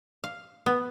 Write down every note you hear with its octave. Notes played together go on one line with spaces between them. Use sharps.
F5
B3